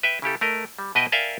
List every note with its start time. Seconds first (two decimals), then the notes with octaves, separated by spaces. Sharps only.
0.03 B4 E5 G5
0.22 C#3 E4 G4 A4
0.41 A3 A#4 D#5
0.79 G3
0.95 B2 B4 D#5 E5 G5 G#5
1.12 A#4 D5 E5 F5 G5 G#5